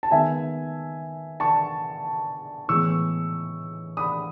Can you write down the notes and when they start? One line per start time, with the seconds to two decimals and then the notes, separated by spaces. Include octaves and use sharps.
0.03 A5
0.11 D#3 G#3 B3 E5 G#5
1.40 A5 C#6
2.68 A2 E3 G#3 B3 C#6 E6
3.97 B5 D#6